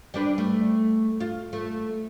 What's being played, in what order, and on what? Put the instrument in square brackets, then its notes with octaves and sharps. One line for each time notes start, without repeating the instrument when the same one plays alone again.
[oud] G3 D4 B4
A3
F4
A3